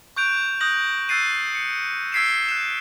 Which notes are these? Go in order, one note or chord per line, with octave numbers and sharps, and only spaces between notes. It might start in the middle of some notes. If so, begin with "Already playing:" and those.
C#6 F#6 G6 D7 F7
D#6 F#6 G6 A#6 F#7
E6 F#6 A6 C7 D#7
C#7
E6 G#6 B6 C7 D7 E7
F#6 E7